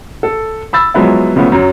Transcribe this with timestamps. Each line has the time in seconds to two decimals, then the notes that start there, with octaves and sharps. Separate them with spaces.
0.23 A4
0.73 B5 E6 A6
0.94 F3 F#3 G#3 B3 E4
1.36 C#3 F3 A3 B3
1.52 F#2 F#3